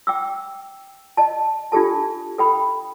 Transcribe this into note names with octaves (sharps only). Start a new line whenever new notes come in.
G5 D6 E6
D#5 A5
D4 F4 G4 A4 A5
A4 G5 B5